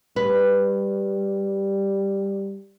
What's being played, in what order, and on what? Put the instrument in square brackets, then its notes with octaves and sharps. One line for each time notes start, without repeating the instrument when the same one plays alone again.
[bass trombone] G3 [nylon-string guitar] B4